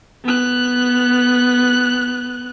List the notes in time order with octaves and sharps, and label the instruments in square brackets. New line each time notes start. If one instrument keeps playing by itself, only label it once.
[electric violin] B3 F#6